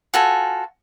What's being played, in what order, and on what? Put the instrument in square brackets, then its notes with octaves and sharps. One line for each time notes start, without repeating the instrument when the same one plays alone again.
[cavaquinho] F4 F#4 A4 G#5